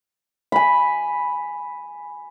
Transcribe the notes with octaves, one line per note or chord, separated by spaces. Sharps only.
G#5 B5